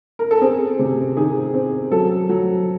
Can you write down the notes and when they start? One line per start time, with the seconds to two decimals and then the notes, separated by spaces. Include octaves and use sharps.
0.19 A#4
0.31 A4
0.41 C4 G#4
0.79 C3
1.17 D#3 G#4
1.54 C4
1.92 F#3 A4
2.29 F#3